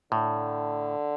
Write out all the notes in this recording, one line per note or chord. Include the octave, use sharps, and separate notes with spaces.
A2 D3